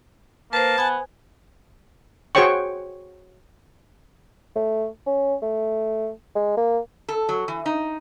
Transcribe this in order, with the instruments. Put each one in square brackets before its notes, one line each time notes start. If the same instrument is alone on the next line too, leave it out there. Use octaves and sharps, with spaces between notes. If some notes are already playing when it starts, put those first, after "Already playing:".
[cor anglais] A#3 [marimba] B4 C5 [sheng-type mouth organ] A5
[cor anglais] B3 [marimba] G#5 F#6 G#6
[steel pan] F#4 G#4 C5 C#5 G5 C#6
[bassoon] A3
C#4
A3
G#3
A#3
[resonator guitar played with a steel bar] A4
F#3
E3
D#4